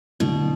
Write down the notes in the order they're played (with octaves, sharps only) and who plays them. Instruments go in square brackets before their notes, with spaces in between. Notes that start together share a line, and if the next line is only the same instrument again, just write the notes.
[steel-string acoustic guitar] B2 [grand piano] D3 F#3 A3 E4